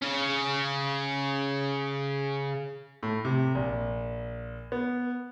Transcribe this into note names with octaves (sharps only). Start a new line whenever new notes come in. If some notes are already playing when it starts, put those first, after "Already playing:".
C#3 C#4
A2
C3
A#1
B3